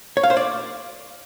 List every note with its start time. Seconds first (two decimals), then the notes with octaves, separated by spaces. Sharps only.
0.17 C#5
0.23 F5
0.30 C5
0.37 D5